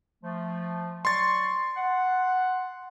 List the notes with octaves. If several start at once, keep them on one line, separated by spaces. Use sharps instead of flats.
F3 A3
F#3 D5 C6 C#6 A6
F#5